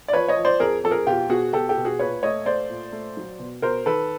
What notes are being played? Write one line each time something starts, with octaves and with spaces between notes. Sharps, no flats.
D5
F3 B4 C#5
C#5 D#5
F3
C5 D5
F2 G#4 A#4
F2 A4
G#4 A#4
B2 F4 G4
B2 F#4 G#4
B2 G4 A4
G4 A4
B2
F#4 G#4
A#2 B4 C#5
A3 C#5 D#5
A3 C5 D5
A#2
A3
F#3
B2
B2 A#4 C5
D#3 A4 B4